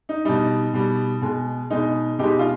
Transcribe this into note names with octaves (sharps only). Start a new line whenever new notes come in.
D#4
B2 G3 D#4
B2 G3
B2 G#3
B2 G#3 D#4
B2 G#3 D#4 G4
F4